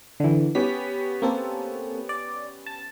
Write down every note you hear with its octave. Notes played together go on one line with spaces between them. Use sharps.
D3 E3
B3 C#4 G4 B6
A#3 C4 A4
D5
A5